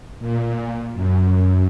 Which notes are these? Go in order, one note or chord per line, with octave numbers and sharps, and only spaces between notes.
A#2
F#2